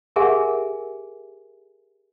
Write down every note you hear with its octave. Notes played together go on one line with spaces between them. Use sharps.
G4 G#4 A#4 E5 F#5 G#5